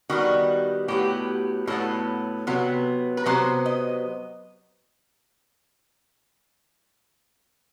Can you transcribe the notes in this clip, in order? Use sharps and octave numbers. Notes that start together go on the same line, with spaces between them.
D#3 G3 B3 F#4
A2 F#3 B3 G4
A2 F#3 B3 A4
C3 F#3 B3
B4
C3 F#3 B3 C5
D#5